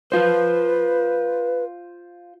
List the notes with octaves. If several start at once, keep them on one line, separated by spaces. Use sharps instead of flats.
F4 B4 C5